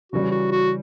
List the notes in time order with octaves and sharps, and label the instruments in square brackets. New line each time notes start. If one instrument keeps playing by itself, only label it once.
[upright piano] C#3 E3 G3 C#4 [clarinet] F#4
[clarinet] F#4
F#4